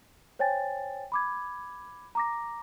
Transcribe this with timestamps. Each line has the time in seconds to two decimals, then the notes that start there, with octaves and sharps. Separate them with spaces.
0.39 C5 C#5 G5 G#5 A6
1.12 B5 D6 G#6
2.15 A#5 D6 A#6